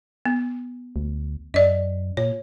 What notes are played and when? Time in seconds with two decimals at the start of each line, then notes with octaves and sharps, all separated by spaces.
0.25 B3
0.96 D2
1.54 F#2 D5 D#5
2.17 A#2 C#5